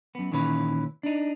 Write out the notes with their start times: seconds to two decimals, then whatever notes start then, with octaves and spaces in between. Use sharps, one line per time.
0.15 F#2 B3
0.32 A#2 D#3 E3 C#4 B4
1.03 D4 D#4